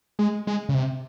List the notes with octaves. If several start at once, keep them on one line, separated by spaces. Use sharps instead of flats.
G#3
G#3
C#3
C3